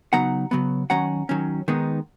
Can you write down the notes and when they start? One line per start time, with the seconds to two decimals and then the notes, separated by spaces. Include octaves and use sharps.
0.13 C#3 F#3 B3 D#4 F#5 A#5
0.51 C#3 F#3 B3
0.90 D#3 F#3 C#4 F#5 A#5
1.29 D#3 F#3 C#4
1.68 D#3 G#3 B3 D#4